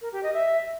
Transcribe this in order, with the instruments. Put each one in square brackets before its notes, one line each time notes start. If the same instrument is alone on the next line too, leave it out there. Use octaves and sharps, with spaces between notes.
[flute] A#4
G4
D#5
E5